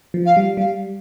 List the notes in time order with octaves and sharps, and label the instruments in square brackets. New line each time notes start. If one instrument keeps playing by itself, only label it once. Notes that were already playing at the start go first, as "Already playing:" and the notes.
[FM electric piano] F3
[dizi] F5
[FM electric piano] G3
[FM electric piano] G3 [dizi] F5